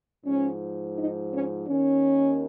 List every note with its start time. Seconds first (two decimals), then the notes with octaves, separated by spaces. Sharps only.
0.25 G#2 F3 C#4
0.97 D#4
1.32 C#4
1.67 D#2 D#3 C#4